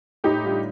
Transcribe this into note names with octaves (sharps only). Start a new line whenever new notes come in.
A2 D#4 G4
G3 D4 F4